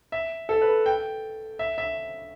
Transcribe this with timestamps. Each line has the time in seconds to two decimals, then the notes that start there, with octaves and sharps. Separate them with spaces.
0.12 E5
0.49 A4
0.62 B4
0.86 G5
1.59 E5
1.78 E5